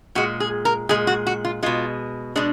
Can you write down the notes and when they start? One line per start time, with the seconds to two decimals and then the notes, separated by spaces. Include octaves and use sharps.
0.15 A#2 G#3 F#4
0.40 G#4
0.65 A#4
0.89 A#2 G#3 G#4
1.07 F#4
1.27 F#4
1.45 F4
1.63 B2 G#3 F4
2.36 B2 G#3 D4